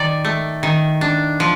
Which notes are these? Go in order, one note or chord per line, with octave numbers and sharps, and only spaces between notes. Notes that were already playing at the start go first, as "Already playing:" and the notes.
Already playing: D#3 D5
A3
D#3
D4
F3